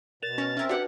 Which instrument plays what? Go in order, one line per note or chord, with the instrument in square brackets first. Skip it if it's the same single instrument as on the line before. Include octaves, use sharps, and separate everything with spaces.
[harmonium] B2 [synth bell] A#4 E7 F7 [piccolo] A6
[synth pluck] C#4 [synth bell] F6 A#6
[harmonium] C4 E5 [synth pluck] C#4 A#4 [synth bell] F6 G#6
[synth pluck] D4 G4 [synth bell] F#4 B4 [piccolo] F#5